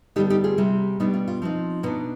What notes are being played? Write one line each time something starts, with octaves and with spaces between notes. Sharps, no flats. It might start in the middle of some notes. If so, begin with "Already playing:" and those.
D3 G3 B3 D#4 G4
D#4 G4
F4 G#4
C3 G3 C4
B2 G3 B3 D4 D#4 G4
F4
F4
F3 C4 D#4
B2 B3 D4 D#4